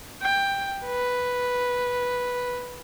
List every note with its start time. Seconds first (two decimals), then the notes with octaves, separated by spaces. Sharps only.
0.22 G5
0.86 B4